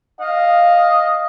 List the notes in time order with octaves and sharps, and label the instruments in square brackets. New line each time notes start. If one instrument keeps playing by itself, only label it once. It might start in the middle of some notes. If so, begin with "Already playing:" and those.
[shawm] D#5 [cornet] F5